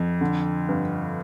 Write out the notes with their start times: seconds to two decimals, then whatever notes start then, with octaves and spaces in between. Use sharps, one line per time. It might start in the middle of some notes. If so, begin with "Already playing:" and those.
Already playing: F2
0.21 D3
0.69 G2